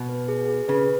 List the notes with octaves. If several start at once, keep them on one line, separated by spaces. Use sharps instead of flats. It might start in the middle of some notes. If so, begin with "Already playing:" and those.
Already playing: B2
B4
G#4
G#4
C#3 B4